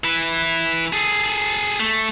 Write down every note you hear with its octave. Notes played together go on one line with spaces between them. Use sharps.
E3 E4
G#4 A4
A3